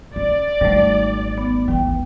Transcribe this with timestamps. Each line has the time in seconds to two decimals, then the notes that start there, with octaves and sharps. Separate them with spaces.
0.16 C#4 D5
0.61 G#1 D#3 G3 A3 D#4
1.38 B3
1.68 D#2 E3 G5